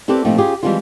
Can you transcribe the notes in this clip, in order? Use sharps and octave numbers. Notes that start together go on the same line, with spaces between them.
C4 E4 G4 A4 B4 D5
A#2 F3 A3 C4 D#4 F4
C#4 F4 G4 G#4
E3 F3 G3 G#3 C4 F4